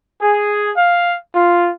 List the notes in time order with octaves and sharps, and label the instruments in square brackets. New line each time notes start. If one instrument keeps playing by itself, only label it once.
[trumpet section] G#4
F5
F4